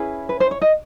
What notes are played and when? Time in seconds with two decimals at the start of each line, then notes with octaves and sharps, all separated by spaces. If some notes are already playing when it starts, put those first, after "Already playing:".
Already playing: C#4 E4 G#4 B4
0.29 B4
0.40 C5
0.51 C#5
0.61 D#5